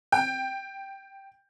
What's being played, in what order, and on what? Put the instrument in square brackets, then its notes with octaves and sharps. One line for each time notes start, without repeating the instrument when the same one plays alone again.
[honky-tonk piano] G5